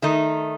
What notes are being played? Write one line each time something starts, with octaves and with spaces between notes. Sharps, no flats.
D#3 A3 D#4